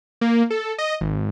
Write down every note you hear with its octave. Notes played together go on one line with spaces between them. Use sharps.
A#3
A4
D#5
G#1